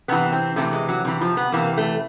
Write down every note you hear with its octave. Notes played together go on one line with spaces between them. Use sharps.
C3 E3 B3
C4
C3 E3 A3
G#3
F#3
C3 E3
F3
B3
C3 E3 A#3
A3